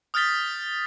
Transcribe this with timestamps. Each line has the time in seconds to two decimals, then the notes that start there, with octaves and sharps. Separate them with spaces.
0.14 D#6 F6 G6 A6 B6 G7